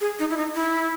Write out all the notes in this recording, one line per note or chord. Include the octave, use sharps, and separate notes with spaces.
G#4
D#4
E4
D#4
E4